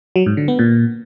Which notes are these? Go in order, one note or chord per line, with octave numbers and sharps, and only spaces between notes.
F#3
G#2
D3
B3
A#2